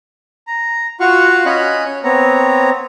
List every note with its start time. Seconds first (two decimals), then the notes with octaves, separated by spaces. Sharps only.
0.47 A#5
1.00 F4 F#4 F5 F#5 C#6
1.46 C#4 C#5 D#5 B5 F#6
1.85 C#5
2.04 B3 C4 C#5 A#5